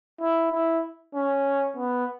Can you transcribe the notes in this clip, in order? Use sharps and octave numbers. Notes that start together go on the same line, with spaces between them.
E4
E4
C#4
B3